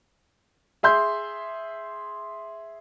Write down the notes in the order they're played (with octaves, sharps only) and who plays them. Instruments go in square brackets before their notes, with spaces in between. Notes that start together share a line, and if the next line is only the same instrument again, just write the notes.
[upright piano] G#4 E5 C6 G6